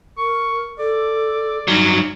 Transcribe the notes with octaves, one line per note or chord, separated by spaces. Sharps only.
A#4 C#6
A4 D5
G2 F#3 D#4